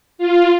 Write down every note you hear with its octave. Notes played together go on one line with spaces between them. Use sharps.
F4